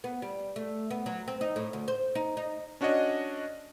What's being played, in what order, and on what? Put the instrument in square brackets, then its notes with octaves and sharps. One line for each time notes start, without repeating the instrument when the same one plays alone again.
[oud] B3
G3
A3
B3
F#3
C4
D#4
A2
D2
C5
D#4
D#4
[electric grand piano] C#4 D4 F#4 C#5 D#5